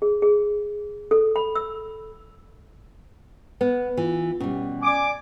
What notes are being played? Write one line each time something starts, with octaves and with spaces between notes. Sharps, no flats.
G#4
G#4
A4
B5
E6
B3 B4
E3 F4
B2 G3 C#4
D5 G#5 D6